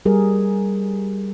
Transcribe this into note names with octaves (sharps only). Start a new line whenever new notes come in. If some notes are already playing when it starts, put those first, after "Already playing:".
G3 G#4 A#4